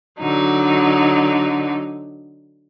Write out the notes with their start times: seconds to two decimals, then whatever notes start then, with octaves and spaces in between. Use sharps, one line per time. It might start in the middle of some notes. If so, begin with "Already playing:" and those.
0.19 D3 F#3 D#4